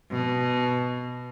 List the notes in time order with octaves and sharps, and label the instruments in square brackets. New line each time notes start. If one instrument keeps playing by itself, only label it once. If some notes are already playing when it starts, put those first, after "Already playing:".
[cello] B2